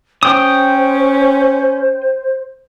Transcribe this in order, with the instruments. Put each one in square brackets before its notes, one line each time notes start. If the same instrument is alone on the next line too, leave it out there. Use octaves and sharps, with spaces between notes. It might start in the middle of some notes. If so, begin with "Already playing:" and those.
[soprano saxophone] C#4 [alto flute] C5 [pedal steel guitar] G5 D#6